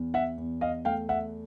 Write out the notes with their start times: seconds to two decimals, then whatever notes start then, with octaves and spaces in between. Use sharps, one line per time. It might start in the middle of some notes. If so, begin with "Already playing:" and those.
Already playing: E2
0.14 E5 F#5
0.37 E2
0.61 D#5 F5
0.85 A3 F5 G5
1.09 E5 F#5